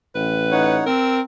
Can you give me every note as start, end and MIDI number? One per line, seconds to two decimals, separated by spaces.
0.15 0.86 33
0.15 0.76 71
0.51 0.84 63
0.51 0.84 73
0.51 0.84 78
0.86 1.21 60
0.86 1.20 70
0.86 1.17 88